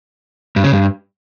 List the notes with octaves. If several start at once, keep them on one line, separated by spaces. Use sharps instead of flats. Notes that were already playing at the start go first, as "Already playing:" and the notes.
G2
C#3
G2